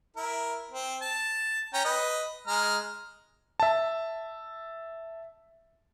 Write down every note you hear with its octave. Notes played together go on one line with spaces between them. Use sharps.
E4 A#4
C4
A5
C#4 G5 A#5
B4 D#5
G#3 A#5 F6
E5 A5